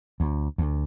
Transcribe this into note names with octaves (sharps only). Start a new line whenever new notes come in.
D2
D2